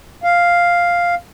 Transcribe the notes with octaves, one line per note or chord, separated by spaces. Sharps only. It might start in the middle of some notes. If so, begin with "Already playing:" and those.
F5